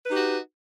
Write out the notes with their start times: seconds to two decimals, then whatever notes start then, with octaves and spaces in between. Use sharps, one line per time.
0.03 B4
0.07 D#4
0.12 G4
0.17 F#4